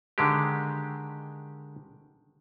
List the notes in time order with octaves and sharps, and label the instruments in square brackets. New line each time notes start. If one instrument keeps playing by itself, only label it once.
[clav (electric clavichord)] D3 D#3 G#3 G4